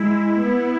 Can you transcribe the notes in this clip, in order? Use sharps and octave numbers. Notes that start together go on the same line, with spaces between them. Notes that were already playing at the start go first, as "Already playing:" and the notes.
Already playing: G#3 E4
B3